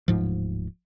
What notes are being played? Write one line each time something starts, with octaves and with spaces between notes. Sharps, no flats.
D1 G#2 F3